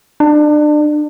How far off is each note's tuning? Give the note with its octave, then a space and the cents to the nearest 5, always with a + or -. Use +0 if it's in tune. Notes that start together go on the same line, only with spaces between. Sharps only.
D4 +30